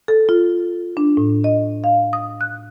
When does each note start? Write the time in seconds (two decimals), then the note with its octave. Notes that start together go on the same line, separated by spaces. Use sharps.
0.08 A4
0.29 F4
0.97 D4
1.17 A2
1.44 D#5
1.84 F5
2.13 D#6
2.41 F#6